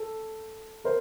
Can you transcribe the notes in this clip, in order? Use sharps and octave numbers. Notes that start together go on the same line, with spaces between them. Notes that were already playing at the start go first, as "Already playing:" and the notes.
Already playing: A4
A#4 C5